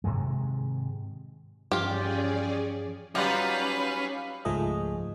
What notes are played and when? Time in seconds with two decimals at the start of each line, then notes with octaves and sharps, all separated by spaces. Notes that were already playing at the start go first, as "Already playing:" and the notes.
0.04 G#2 C3 D#3 G#3
1.72 G2 E3 F3 C#4 F4 G4 G#4 D5
3.15 F#3 G3 C#4 D#4 F4 B4 F5 D6
4.45 C#2 G#2 F3 A3 G#4 D#5